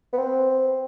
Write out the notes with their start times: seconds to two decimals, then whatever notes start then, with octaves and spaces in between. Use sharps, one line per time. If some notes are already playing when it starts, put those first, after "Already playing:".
0.13 B3
0.18 C4